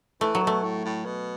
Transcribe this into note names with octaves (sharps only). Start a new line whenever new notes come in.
E3 A3
F#3
B2 A3
A2
A2
B2